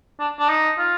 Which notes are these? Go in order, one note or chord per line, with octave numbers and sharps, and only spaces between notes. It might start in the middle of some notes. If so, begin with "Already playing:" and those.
D4
D4
D#4
F4